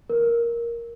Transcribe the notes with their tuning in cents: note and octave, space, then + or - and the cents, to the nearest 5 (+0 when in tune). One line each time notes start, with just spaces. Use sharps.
A#4 +5